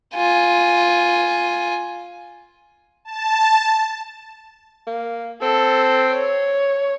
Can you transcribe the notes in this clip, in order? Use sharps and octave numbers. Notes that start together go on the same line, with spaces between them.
F4 G#5
A5
A#3
C4 A4
C#5